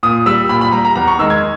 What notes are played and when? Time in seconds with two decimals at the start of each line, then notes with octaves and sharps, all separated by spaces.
0.03 A#2 D#6
0.26 G3 E6
0.49 A#2 B5
0.61 B5
0.72 G3 A#5
0.85 A#5
0.95 E2 A#5
1.07 C#6
1.19 D#3 G#3 E6
1.30 G#6